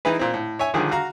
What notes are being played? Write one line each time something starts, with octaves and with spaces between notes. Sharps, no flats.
E3 D#4 E4 G#4 B4
A#2 C4
A2
C#5 E5 G#5
A#1 D3 D#3 F3 G3 G#4
F#4 F5 A#5